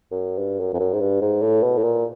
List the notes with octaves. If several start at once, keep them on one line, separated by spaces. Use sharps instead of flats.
F#2
G2
F#2
F2
F#2
G#2
G2
G#2
A2
B2
A2
A#2